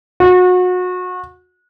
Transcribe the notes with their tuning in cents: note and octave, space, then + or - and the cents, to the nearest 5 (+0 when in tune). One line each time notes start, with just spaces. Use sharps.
F#4 -30